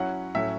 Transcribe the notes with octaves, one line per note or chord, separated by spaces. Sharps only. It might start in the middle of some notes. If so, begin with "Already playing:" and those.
Already playing: F#3 C#4 E4 F#5
A2 F#3 C#4 E5